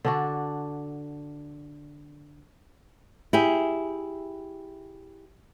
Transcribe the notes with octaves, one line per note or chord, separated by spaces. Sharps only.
D3 D4 F#4
E4 G4 G#4